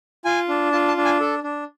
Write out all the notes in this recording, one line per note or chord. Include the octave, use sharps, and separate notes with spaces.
F4 G#5
D4
F4 A5
A5
D4
G#5
A4
D4